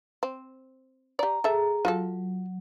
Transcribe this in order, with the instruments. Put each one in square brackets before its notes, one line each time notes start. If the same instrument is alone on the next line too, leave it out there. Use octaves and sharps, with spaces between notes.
[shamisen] C4
[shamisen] G4 D5 [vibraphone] A#5
[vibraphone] G#4 A#5 [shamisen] A4 E5
[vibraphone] F#3 [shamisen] F4 F#4 A4